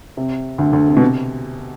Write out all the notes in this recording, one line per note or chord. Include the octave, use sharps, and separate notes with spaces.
C3
D2 D3
D2 D3
C3
B2
C3